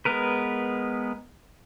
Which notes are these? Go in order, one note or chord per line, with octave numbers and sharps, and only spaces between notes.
G#3 B3 A#4 B4